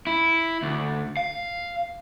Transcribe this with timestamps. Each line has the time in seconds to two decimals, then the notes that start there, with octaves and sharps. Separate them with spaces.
0.07 E4
0.63 D2
1.17 F5